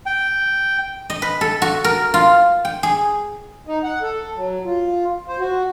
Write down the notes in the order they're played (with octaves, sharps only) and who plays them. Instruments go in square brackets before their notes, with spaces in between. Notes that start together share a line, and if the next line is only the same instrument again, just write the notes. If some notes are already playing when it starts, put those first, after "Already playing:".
[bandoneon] G5
[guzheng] D#5
B4
A4
F#4
A#4
F4
G5
G#4
[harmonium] D#4
F#5
A4
F#3
F4
C5
F#4